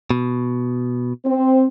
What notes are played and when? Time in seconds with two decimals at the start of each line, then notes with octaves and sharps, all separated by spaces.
0.10 B2
1.26 C4